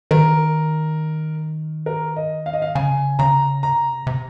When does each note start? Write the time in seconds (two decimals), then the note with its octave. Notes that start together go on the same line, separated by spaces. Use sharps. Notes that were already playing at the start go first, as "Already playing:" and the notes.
0.11 D#3 A#4
1.86 A#4
2.16 D#5
2.46 F5
2.53 D#5
2.62 F5
2.75 C#3 G#5
3.19 C#3 A#5
3.63 C3 A#5
4.07 C3